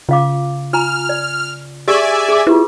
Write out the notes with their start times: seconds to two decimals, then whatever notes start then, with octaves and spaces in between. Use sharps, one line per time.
0.09 C#3 F4 F5 D6
0.73 F4 G#5 A#5 F6
1.09 D5
1.88 G4 G#4 D5 E5 G#5 C#6
2.29 G#4 D6
2.47 E4 F4 G4 B4